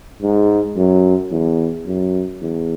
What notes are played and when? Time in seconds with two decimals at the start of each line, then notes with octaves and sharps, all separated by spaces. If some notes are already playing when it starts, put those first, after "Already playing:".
0.22 G#2
0.77 F#2
1.31 E2
1.86 F#2
2.41 E2